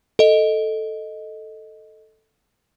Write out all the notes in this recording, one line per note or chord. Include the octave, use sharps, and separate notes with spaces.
A4 D#5